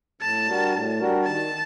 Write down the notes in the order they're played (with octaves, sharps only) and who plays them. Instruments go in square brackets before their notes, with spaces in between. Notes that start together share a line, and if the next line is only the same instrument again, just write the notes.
[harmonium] A2 [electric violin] A5
[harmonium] G3 D4 F#4 A#4
A2
G3 D4 F#4 A#4
[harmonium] D#3 [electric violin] A5